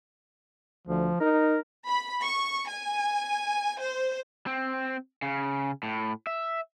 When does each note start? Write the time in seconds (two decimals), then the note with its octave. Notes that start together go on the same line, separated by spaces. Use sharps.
0.87 D2 F3
1.21 D#4 A#4
1.88 B5
2.25 C#6
2.70 G#5
3.81 C5
4.47 C4
5.22 C#3
5.83 A2
6.27 E5